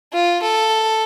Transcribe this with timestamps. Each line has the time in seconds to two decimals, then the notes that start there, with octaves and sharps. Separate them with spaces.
0.13 F4
0.42 A4